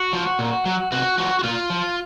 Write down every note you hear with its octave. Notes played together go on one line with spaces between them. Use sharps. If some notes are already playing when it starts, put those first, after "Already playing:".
Already playing: F#4
F3
A#2
F#3
C3 F#4
F3 F#4
F#4
A#2 F4
F3